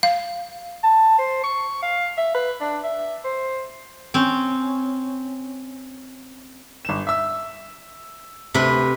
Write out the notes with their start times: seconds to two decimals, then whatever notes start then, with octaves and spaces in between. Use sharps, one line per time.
0.03 F5
0.83 A5
1.18 C5
1.44 C#6
1.82 F5
2.18 E5
2.35 B4
2.61 D4
2.84 E5
3.25 C5
4.14 C4 C#4
6.85 G1 E7
7.07 E5 E6
8.54 D2 C3 B4 B5